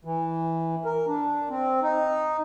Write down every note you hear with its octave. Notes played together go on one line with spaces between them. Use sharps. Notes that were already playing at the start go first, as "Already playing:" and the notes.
E3
A#4
D4
C4
D#4